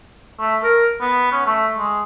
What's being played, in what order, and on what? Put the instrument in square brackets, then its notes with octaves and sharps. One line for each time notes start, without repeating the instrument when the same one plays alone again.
[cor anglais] A3
A#4
B3
C#4
A3
G#3